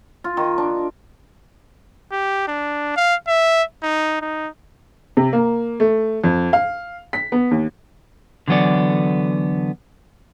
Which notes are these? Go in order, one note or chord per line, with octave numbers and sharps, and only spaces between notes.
F4
D#3
D4
G4
D4
F5
E5
D#4
D#4
C3
A#3
A3
F2
F5
B6
B3
D#2
D3 E3 F#3 B3 A4 D5